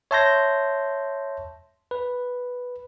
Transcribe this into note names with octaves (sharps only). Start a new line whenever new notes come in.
C#5 E5 A5 C6 G6 A#6
B4